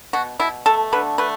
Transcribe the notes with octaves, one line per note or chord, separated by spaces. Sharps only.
B2 F#4
B2 E4
A3 A4
D3 B4
A3 B4